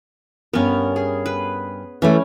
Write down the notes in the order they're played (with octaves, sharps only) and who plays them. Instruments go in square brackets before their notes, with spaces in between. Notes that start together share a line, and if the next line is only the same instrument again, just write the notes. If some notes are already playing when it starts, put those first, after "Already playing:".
[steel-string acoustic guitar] G2 A#4 [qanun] B3 C#4
[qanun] G#4
B4
[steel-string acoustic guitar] E3 A3 [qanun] G3 C#4